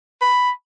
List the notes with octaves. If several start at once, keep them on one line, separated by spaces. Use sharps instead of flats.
B5